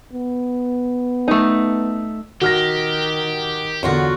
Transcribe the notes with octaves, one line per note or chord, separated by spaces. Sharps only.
B3
A3 D#4
D#3 F#4 G4 F6 A#6
E2 D3 F#3 F4 F#4